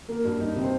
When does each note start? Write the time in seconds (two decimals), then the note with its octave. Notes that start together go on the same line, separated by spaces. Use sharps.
0.09 A#3 A#4
0.25 G2
0.40 D#4
0.56 C3
0.63 C5